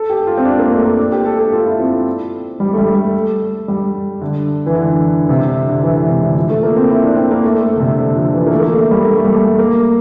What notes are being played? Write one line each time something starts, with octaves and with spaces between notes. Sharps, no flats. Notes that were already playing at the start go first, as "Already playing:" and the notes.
Already playing: A4
G4
F4
C4
D4
A#3
A3
A#3
D4
G4
A4
A4
F4
E4
C4
G3
A3
G3
A3
G3
D3
E3
D3
C3
D3
D3
E3
D3
C3
D3
F3
A3
A#3
C4
E4
D4
C4
A#3
A3
A3
D3
C3
D3
F3
E3
A#3
A3
A#3
A3
A3
G3
A#3
A3
G3
A3
A#3